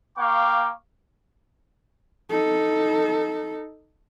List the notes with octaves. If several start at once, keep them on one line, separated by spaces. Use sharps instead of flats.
A#3 F5 G5 C#6 D6
D#4 A4